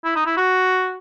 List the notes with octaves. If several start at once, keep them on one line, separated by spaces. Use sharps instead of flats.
E4
D#4
E4
F#4